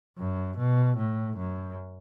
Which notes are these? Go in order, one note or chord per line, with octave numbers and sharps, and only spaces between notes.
F#2
B2
A2
F#2